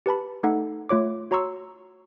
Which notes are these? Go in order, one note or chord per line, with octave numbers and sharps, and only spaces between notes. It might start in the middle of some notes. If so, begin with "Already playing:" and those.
G4 B4 A5 B5
A3 D#4 A4 F#5
A3 F4 C#5 D6
F#4 C#5 A#5 C6 C#6 E6